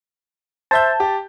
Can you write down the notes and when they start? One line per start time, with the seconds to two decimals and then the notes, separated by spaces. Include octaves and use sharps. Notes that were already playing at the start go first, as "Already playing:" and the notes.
0.71 C5 E5 A5 G6
1.00 G4